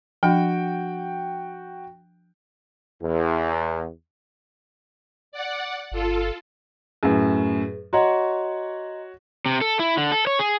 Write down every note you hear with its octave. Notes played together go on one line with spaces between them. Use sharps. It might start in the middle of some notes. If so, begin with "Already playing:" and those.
F3 D4 F#4 G5
E2
D5 F#5
G1 F4 A4
F#2 A2 G#4 B4
F#4 C#5 D#5 F#5 A#5 C6
C3
A4
E4
D3
A4
C#5
G#4